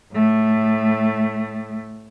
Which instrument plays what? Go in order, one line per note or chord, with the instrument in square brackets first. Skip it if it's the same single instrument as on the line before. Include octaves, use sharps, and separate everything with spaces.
[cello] A2 A3